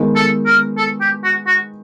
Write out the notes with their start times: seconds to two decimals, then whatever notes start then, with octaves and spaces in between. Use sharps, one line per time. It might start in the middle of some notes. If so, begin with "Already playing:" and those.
Already playing: D#3 G#3 B3
0.16 A4
0.46 A#4
0.77 A4
1.01 G4
1.24 F#4
1.47 F#4